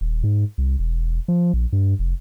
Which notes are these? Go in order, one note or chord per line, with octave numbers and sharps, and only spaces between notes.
D#1
G#2
C2
E1
F3
A#1
G2
F1